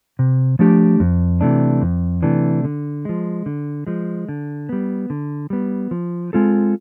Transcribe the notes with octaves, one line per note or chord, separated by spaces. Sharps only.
C3
F3 A3 D4 G4
F2
C3 E3 A3 D4
F2
C3 E3 A3 D4
D3
F3 G#3
D3
F3 G#3
D3
G3 B3
D3
G3 B3
F3
G#3 C4 F4 A4